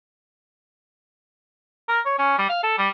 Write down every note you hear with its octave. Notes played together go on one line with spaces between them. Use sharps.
A#4
C#5
C#4
G3
F5
A4
G3